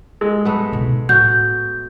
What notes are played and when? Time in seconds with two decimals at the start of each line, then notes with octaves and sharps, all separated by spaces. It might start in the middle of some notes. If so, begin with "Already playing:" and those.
0.21 G#3
0.45 A3 B3
0.72 B2 D#4
1.09 A2 F#4 G6